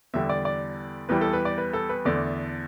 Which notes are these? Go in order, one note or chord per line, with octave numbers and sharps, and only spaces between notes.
E2 D3 G3 E5
D5
D5
E2 E3 G3 B4
A4
B4
D5
B4
A4
B4
E2 D3 A3 D5